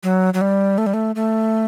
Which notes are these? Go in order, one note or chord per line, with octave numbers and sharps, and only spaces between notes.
F#3
F#3
G3
A3
G3
A3
A3